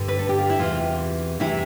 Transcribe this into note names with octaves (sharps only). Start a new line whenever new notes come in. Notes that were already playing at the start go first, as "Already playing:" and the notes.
Already playing: G2 D3
B4
A4
G4
F4
E4
E2 C3 E3 F4
E2 C3 E3 E4